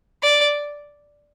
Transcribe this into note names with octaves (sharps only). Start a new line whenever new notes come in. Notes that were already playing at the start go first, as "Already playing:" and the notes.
D5